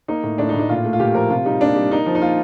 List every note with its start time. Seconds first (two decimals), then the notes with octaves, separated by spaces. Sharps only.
0.08 A#3 D#4
0.23 A2
0.38 A2 D4
0.49 D#4
0.54 A2
0.59 D#4
0.69 A#2 F4
0.85 A3
0.93 F4
1.00 A#2 G4
1.14 F3 A#4
1.30 C3 F4
1.45 G3 D#4
1.61 A#3 D4
1.75 G3
1.91 A#3 D#4
2.06 F3
2.15 D#4
2.22 A#3 F4